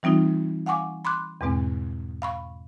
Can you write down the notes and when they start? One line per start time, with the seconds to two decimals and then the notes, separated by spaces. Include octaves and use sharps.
0.03 E3 G3 C4 D#4 F4
0.66 F5 F#5 G#5 C#6 D6
1.05 B5 C6 D6 F#6
1.41 E2 G#2 B2 G#3 C4
2.22 F5 B5 C#6